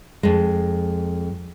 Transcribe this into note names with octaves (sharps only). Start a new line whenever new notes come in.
F2 G#3